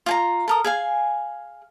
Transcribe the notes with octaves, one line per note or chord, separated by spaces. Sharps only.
F4 G#5 A#5
A4 A#4 D#6
G#4 F5 G#5